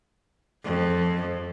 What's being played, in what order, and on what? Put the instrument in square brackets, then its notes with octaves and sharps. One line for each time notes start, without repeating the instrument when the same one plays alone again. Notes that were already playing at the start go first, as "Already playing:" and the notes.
[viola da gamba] F2